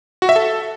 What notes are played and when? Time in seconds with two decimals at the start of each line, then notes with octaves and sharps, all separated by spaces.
0.22 F#4
0.29 E5
0.36 A4